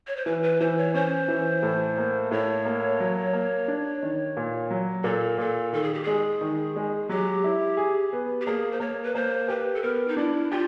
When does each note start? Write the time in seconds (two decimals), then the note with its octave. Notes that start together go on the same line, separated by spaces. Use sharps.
0.07 C#5
0.17 C5
0.26 E3 B4
0.43 B4
0.60 E3 C5
0.77 C#5
0.94 C#4 C5
1.28 E3
1.63 A2
1.98 A#3
2.31 A2 C#5
2.65 A#3
3.00 F#3
3.33 A#3
3.68 D4
4.03 D#3
4.37 A#2
4.71 F#3
5.04 A#2 A4
5.38 A#2 A4
5.73 D#3 A4
5.83 G#4
5.94 G4
6.03 G#3 G#4
6.41 D#3
6.76 G#3
7.09 F#3 G4
7.44 E4
7.77 G#4
8.13 B3
8.41 G4
8.46 A#3 G#4
8.72 C5
8.80 A#3 C#5
9.03 B4
9.15 A#3 C5
9.48 G4 B4
9.75 A4
9.83 B3 A#4
10.08 D#4
10.17 D4 E4
10.51 F4 G4